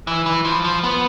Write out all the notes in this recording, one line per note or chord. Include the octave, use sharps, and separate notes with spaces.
E3
E3
F3
F3
B3